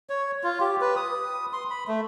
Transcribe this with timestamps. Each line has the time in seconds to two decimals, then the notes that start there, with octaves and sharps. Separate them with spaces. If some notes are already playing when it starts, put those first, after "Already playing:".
0.10 C#5
0.44 F4
0.61 G4
0.81 B4
0.96 D#6
1.53 C6
1.70 B5
1.87 A3